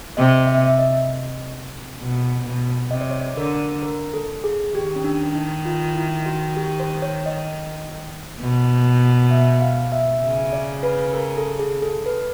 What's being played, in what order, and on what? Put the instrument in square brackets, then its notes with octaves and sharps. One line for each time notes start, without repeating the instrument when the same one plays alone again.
[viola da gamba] C3 [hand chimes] D#5
[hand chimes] E5
E5
D#5
[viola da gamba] B2
B2
[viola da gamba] C3 [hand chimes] D#5
[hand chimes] D5
C#5
D5
[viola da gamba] D3 [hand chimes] A#4
[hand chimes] A#4
A4
G#4
[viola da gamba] D#3 [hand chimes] G4
[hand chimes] C#4
D4
D#4
F4
E4
F#4
G4
C5
C#5
D#5
[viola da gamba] B2
[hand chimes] E5
F5
E5
[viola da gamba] C#3 [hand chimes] E5
[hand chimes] D5
B4
A#4
A4
G#4
A4
B4